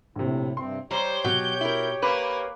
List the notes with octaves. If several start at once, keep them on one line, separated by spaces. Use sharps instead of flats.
A#1 A2 C3
G2 C3 C4 C6
G3 G4 C5 C#5 A#5
B2 F#3 G6
E4 A#4
A#3 B4 D6